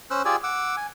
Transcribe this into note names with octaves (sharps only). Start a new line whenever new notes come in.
C#4 C5 E6 F#6
F4 G4 G#4 D5 G#5 E6
F#5 D6 E6
G#5